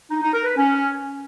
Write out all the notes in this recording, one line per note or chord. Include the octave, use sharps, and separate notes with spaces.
D#4
D#4
A#4
B4
C#4